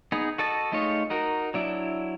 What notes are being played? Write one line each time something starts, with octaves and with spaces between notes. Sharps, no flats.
B3 D#4 G#4
F#4 A4 D#5 A5
G#3 A3 D#4 F4 C#5
D#4 F#4 A#4
F#3 D4 E4